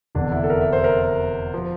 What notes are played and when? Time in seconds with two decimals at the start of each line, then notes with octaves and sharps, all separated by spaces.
0.15 F1 E2 D3 D4
0.32 E4
0.44 A4
0.50 A#4
0.61 E5
0.73 C5
0.84 A#4
1.54 F3